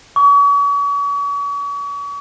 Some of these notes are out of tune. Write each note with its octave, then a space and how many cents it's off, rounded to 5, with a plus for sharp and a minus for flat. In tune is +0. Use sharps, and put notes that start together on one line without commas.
C#6 +40